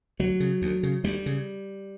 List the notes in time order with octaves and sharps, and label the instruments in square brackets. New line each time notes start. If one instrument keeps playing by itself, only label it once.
[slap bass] D2 F#3
C#3
D2
C#3
D2 G3
C#3